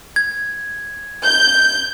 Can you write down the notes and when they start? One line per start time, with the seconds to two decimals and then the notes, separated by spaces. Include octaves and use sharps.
0.16 G#6
1.24 G6